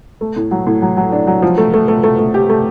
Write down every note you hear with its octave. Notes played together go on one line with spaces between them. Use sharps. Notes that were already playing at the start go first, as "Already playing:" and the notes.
A3
A2
F#3
A2
F#3
F#3
D4
F#3
F3
A3
A3
A3
A3
A3
G4
A3